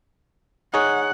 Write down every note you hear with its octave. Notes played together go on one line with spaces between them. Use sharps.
D#4 G#4 C#5 F#5